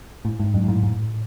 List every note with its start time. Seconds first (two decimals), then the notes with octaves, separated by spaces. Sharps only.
0.25 A2
0.40 G#2
0.54 F#2
0.64 G#2
0.68 A2
0.83 A2